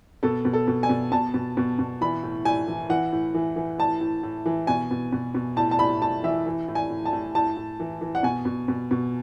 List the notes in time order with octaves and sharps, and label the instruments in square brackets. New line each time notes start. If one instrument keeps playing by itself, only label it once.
[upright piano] B2 A4
B2
A4
B2
G#5
B2
B2 A5
B2
B2
B2
E3 B5
A2
A2 G#5
E3
E3 F#5
A2
E3
E3
A2 A5
A2
A2
E3
B2 G#5
B2
B2
B2
A2 A5
A5
A2 B5
A2 A5
E3 E5
E3
A2
G#5
A2
A5
A2
A2 A5
A2
E3
E3
F#5
B2 G#5
B2
B2
B2